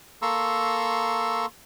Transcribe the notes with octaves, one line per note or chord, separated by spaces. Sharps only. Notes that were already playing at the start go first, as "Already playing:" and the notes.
A#3 A4 A#5 C6 C#6 E6